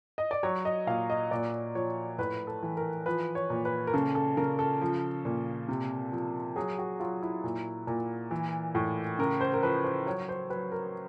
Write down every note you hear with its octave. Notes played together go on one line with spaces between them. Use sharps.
D#5
D5
F#3 C#5
D#5
A#2 F5
D#5
A#2 D5
F3 C#5
A2 B4
A4
E3
A#4
F3 B4
C#5
A#2
B4
A#4
C#3 A4
A4
C#3 A#4
A4
F3
A#2
C3
F3
F#3 G#4
F#4
F#3 F4
E4
A#2
A#2
E3
A2
C#3 A#4
C5
A#4
F3 B4
C5
F#3 C#5
C5
F#3 B4
A#4